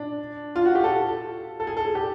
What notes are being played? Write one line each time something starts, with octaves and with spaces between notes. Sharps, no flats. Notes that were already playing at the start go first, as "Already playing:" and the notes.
Already playing: D4
F4
F#4
G4
A4
A4
G#4
A4
G#4
G4